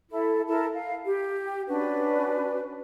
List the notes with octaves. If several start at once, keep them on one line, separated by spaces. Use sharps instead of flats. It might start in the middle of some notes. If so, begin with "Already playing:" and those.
E4 A4
E4 A4 A#4 A5
F5
G4
C#4 D4 F#4 B4